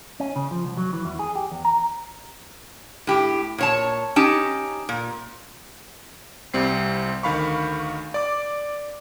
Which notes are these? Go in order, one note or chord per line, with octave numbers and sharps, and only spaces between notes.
C#4
C#3
F3
C2
F#3
E3
E2
G#4
G4
E2
A#5
A2 G4
A#2 C#5 A5
C#4 D#4 G4 A5
A#2
C2 G3 C4 C7
D2 D#3 F5 B5 C#6
D5 D6